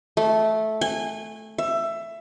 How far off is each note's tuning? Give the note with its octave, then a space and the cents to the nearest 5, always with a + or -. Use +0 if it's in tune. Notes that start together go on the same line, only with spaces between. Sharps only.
A3 -10
G#5 -25
E5 +20